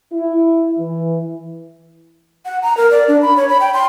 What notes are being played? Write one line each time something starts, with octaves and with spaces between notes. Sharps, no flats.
E4
E3
F#5
A#5
A#4
D5
D4
B5
C#5
B5
G5
C6